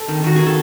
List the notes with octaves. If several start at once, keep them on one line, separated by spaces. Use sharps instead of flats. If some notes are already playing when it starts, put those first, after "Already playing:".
Already playing: A4
D#3
D#3 F#4
D#3 G#4
A4